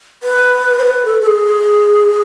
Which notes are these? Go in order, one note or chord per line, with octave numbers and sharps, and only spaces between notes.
B4
C5
B4
A4
A4
G#4